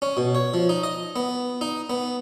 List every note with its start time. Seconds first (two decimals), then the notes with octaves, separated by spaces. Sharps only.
0.02 C#4
0.17 B2
0.35 C#5
0.54 F3
0.69 D#4
0.83 D#5
1.16 B3
1.61 D#4
1.90 B3